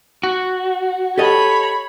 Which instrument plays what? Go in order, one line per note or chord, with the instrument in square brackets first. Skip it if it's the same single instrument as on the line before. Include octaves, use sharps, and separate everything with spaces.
[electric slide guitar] F#4
[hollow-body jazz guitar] G4 A4 D#5 [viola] C#5 B5